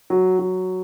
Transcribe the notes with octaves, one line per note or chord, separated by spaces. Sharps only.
F#3
F#3